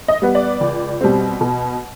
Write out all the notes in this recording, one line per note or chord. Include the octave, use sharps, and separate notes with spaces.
D#5
G3 B3
D5
C#2
B2 G3 C4
B2